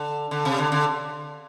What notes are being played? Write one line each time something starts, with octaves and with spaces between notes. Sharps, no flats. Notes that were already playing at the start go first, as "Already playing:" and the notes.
Already playing: D3
D3
C3
D3
D3